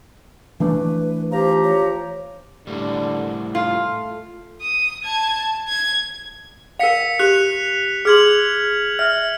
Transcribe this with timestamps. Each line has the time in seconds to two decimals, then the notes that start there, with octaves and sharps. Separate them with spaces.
0.60 E3 A3 D4 B4
1.31 F3 G4 C5 A#5
1.63 C#5
2.67 A2 D3 G3
3.55 A3 F4
4.61 D#6
5.04 A5 G#6
5.68 G#6
6.79 A#4 F5 B6 C#7 F7
7.19 G4 F#6 F7
8.05 G#4 C6 F6 G#6 F#7
8.99 E5 F6